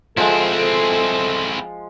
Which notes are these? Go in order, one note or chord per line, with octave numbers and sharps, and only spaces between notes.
F3 G#3 C4 E4 A4